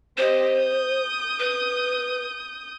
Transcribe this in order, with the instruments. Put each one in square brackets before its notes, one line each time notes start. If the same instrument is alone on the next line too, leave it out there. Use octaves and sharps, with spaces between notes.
[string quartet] C4 G4 D#5 [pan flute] C5
[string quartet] D#6 G6
[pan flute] B4